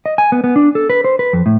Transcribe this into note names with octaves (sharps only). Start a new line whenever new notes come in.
D#5
G#5
B3
B3
D4
A4
B4
C5
B4
F2
A2